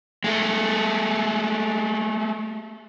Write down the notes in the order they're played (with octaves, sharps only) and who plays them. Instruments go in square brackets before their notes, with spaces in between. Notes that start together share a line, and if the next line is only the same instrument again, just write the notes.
[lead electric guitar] G#3 A3